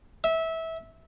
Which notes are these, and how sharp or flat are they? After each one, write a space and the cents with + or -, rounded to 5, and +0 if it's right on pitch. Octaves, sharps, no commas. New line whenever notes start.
E5 -20